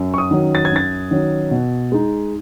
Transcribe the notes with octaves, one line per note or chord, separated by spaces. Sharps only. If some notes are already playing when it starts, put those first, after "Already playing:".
Already playing: F#2
C#6
D#6
D#3 F#3 C#4
A6
G#6
F#2 A6
D#3 F#3 C#4
B2
G#3 D#4